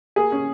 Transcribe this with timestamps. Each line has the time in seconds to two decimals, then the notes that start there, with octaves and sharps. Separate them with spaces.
0.16 A#3 G#4
0.32 C#4